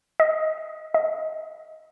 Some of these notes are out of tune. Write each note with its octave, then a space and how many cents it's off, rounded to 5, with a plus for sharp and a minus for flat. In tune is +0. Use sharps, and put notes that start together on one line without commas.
D#5 +10
D#5 +15